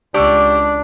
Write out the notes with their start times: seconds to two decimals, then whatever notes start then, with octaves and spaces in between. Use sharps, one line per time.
0.14 C#2 D4 G4 D5 C#6 E6